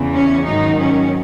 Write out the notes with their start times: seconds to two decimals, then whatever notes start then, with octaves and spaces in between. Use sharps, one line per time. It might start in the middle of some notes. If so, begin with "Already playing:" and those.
Already playing: E2 C#3 E3
0.13 C#4
0.45 G#2 D#3 F#3 D#4
0.78 C#4